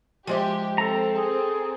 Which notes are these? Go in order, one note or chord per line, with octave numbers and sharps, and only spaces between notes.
F3 G#3 G4 E5
C4 A4 A#5
G#4